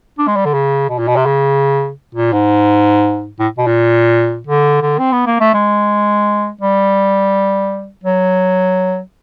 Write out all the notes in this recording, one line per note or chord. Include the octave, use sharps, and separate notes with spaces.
D4
G#3
G3
D3
C#3
B2
A#2
B2
C3
C#3
A#2
G#2
A2
B2
A#2
D3
D3
C4
B3
A#3
A3
G#3
G3
F#3